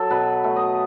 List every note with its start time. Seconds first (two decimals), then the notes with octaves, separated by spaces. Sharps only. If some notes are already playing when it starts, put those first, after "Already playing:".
Already playing: F#3 A4
0.10 B2 B4
0.44 A3
0.56 D#5